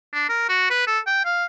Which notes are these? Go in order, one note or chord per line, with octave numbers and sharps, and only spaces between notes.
D4
A#4
F#4
B4
A4
G5
F5